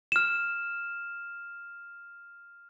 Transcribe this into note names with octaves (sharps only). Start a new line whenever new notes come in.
F6 E7